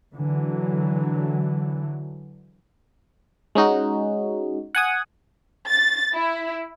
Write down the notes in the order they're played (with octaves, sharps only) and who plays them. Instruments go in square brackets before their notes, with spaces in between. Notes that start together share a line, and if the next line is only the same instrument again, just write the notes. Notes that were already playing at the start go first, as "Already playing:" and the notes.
[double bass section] D3 E3 F#3
[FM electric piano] G#3 C#4 D#4 F#4
F#5 G#5 D#6
[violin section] A6
E4